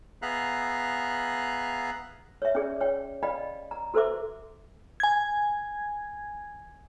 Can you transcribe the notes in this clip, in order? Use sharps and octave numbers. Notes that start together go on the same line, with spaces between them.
B3 G#4 E5 F5 A#5 F#6
C#5 E5
C#4 G#4 D5
C#5 G5
D5 D#5 F5 G5 B5
A#5
F#4 A4 B4 C5 E5 D6
G#5 G#6